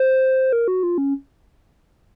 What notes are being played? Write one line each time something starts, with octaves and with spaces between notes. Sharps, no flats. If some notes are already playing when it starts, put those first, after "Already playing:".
Already playing: C5
A#4
F#4
F4
C#4